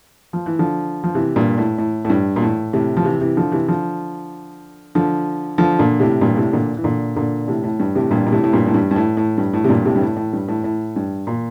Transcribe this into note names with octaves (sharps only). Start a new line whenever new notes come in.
F3
E3
D3 F3
F3
C3 E3
G2 A#2
A2
A2
A2
G2
A#2
A2
A2 C3
F3
C3 E3
C3 E3
D3 F3
C3 E3
D3 F3
D3 F3
D3 F3
A#2 D3
A2 C3
G2 A#2
A2 C3
A#2 D3
E3
A#2 D3
A#2 D3
A2 C3
A2
G2
A2 C3
G2 A#2
A#2
A2 C3
A2
G2 A#2
A2
G2
G2
A2
A2
G2
A2
C3
G2 A#2
A2 C3
G2
A2
A2
G2
A2
A2
G2
A#2